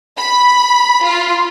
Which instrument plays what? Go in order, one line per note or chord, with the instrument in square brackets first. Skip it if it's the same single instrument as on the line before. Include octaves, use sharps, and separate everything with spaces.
[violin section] B5
F4